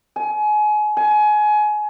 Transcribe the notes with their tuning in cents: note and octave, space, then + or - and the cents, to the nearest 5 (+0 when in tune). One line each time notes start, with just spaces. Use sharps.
G#5 +30
G#5 +25